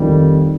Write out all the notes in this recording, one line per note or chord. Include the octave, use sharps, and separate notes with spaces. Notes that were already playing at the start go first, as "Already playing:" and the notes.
Already playing: F2 D#3 G3